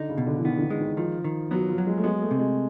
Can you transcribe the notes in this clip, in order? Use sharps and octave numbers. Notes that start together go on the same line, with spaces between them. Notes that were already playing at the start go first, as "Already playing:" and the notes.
Already playing: D3 D#4
C#3
B2
D3
E3
D#3 B3
D3
D#3
G#3
D#3
D#3 F3
D#3
F#3 B3
F3
F#3
G#3
A3
G#3 B3
A3
C3
G#3